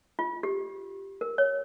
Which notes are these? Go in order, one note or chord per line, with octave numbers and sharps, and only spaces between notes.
F4
G4
A#4
C#5